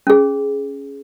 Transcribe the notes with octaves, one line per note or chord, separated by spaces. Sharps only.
C#4 G#4